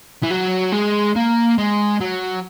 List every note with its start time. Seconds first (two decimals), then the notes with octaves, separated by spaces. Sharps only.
0.23 E3
0.31 F#3
0.72 G#3
1.16 A#3
1.58 G#3
2.00 F#3